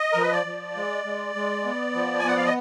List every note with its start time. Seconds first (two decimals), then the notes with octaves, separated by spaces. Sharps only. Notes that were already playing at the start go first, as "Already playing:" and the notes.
Already playing: D#5
0.13 F3 A#4
0.22 B4
0.32 D5
0.46 F3
0.76 G#3
1.05 G#3
1.35 G#3
1.65 B3
1.95 F3
2.19 G#5
2.24 B3 F#5
2.37 F5
2.45 D#5